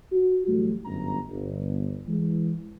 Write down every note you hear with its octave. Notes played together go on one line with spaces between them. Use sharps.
F#4
A2 E3 F#3 G3 A3
G1 F#2 A#5
G1
E3 G#3